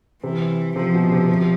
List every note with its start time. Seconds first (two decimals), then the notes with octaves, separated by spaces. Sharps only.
0.23 C3 E3
0.76 C3 F3
0.94 B2
1.12 C3
1.29 C3